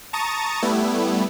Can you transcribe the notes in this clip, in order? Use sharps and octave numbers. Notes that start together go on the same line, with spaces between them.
A5 A#5 C#6 D#6 A6
G3 A3 B3 E4